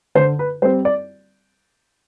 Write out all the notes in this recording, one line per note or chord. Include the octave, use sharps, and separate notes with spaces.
D3 C5
B4
G3 C4 C5
D5